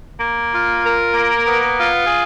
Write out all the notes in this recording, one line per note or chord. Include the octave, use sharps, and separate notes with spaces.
A#3
F4
A#4
A#3
B3
F4
G#4